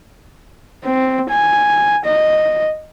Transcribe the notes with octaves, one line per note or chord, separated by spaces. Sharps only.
C4
G#5
D#5